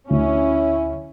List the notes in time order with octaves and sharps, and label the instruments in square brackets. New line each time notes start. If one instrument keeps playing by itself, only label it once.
[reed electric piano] D2 [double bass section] C#4 [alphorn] E4